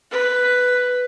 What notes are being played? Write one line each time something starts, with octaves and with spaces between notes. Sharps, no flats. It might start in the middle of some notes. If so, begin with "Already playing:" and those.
B4